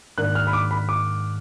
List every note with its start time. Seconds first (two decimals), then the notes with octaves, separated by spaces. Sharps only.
0.18 G#2 D#3 A#3 D4 F#6
0.35 F6
0.47 B5
0.53 D6
0.71 B5
0.89 D6